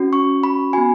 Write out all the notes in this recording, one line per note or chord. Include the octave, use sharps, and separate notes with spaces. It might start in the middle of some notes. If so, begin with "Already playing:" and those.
Already playing: C#4 F#4
C#6
B5
B3 F#4 G#5